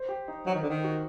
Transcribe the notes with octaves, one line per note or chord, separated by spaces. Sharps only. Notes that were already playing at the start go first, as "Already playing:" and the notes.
Already playing: C5
G4
D#4
F#3 D#4
D#3
D3
D#3
F#4